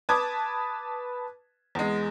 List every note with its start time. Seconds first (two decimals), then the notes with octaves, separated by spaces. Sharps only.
0.09 B4 A5 D6 D#6 G#6
1.75 E2 G#3